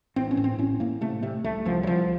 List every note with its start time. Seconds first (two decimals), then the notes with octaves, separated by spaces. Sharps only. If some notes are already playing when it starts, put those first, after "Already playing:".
0.16 A1 C4
0.31 C#4
0.37 A2
0.44 C4
0.58 A2 C#4
0.80 A2 A#3
1.01 C3 A3
1.23 C3 A3
1.44 C2 A3
1.65 C2 F3
1.83 F#3
1.87 C2 F3